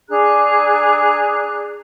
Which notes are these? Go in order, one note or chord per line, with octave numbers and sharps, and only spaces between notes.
D4 G#4 A#5 F#6